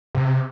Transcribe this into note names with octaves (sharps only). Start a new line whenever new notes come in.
C3